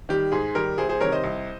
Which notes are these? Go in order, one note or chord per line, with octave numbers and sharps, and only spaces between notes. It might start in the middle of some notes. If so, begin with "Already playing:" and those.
D#3 G3 G4
G#2 G#4
D#3 G3 G4 A#4
C2 G#4 C5
G#4 C5
C3 D#3 G3 A#4 C#5
C5 D#5
C2